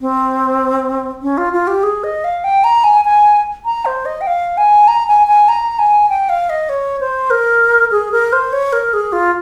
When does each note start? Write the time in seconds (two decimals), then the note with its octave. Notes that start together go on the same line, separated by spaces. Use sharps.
0.01 C4
1.22 C#4
1.37 F4
1.53 F4
1.67 G4
1.83 G#4
2.04 D#5
2.24 F5
2.44 G5
2.64 A#5
2.84 G#5
3.05 G#5
3.65 A#5
3.85 C5
4.05 D#5
4.21 G5
4.27 F5
4.57 G#5
4.88 A#5
5.07 G#5
5.27 G#5
5.48 A#5
5.79 G#5
6.09 G5
6.29 F5
6.49 D#5
6.69 C#5
7.00 C5
7.30 A#4
7.91 G#4
8.12 A#4
8.32 C5
8.52 C#5
8.72 A#4
8.93 G#4
9.12 F4